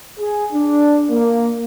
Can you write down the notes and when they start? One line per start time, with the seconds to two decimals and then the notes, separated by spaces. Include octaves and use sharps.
0.19 G#4
0.53 D4
1.11 A#3